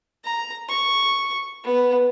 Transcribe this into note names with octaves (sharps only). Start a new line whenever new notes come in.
A#5
C#6
B3